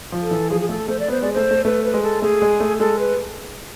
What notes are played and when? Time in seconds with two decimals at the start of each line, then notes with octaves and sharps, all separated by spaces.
0.12 F3
0.22 A4
0.31 E3
0.50 F3 G#4
0.60 G#4
0.69 A3 A4
0.88 A3 C5
1.00 D5
1.08 B3 C5
1.22 G#3 D5
1.33 A3 C5
1.51 A3
1.65 A3 B4
1.84 B4
1.94 G#3
2.03 A4
2.22 A3 G#4
2.42 G#3
2.60 A3
2.80 G#3 A4
2.99 B4